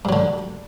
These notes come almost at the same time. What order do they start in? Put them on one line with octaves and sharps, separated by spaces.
G2 F#3 D3